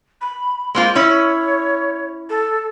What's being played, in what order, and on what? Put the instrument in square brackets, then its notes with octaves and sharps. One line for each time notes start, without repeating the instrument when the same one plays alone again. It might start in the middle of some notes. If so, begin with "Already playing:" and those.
[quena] B5
[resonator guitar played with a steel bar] G#3 A#3 F4 [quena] C5
[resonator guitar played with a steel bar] C#4 E4 [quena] C#5
[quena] A4